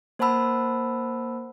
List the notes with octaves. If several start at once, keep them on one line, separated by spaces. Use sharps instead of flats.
A#3 C5 F#5 A5 B5 E6